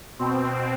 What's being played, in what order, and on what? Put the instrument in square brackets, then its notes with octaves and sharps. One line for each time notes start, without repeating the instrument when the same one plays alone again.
[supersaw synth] B2 C4